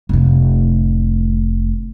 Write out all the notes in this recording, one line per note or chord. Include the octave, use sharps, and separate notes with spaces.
F1 A2